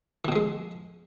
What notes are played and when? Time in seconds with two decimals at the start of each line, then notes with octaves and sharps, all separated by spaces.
0.25 E3
0.28 B2
0.32 F3
0.36 G#3